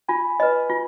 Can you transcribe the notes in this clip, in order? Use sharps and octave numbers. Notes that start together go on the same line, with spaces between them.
F4 G#5 B5
B4 D#5
F4